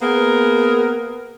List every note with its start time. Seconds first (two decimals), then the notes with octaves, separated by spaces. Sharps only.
0.01 A#3 B3 G#4 A#4